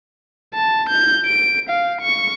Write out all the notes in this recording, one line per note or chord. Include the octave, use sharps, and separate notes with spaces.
A5
G6
D7
F5
C#6